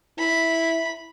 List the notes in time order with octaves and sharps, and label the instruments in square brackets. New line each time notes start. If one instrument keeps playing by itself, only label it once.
[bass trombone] E4 [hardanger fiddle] B5